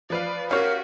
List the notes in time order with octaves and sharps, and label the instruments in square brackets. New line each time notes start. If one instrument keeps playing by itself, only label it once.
[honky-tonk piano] F3 B4 F5 [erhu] D5
[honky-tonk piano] C#4 G4 [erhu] F#4 [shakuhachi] A#4 [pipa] C#5 F5